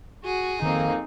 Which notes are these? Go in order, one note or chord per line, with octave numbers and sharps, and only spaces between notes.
F#4 G#4
F2 D#3 A#3 C4 D#4